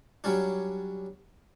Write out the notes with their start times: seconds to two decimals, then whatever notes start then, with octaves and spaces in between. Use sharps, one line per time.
0.24 F#3 G3 C#4 D4